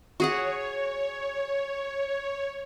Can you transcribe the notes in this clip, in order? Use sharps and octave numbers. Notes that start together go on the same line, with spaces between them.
F#4 G#4 C#5 F#5